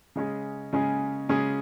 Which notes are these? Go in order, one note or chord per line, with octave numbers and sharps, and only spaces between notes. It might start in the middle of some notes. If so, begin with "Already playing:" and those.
C#3 G#3 C#4 G#4
C#3 G#3 C#4 G#4
C#3 G#3 C#4 G#4